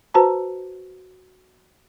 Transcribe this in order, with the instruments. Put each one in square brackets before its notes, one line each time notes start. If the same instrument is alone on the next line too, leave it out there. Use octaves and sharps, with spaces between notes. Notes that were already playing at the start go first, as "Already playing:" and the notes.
[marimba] F#4 B4 C5 A5 A#5